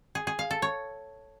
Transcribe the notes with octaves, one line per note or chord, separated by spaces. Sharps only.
G#4
G#4
F5
A4
C#5